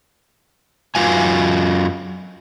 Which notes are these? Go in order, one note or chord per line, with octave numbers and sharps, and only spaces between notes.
F#2 F#3 F4 G#5